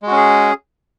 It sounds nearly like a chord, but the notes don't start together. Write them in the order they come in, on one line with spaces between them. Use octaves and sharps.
G#3 F#4 C#4 G#4